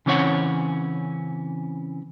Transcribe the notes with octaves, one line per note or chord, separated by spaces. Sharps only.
C#3 E3 C4 C#4 C#5 F#5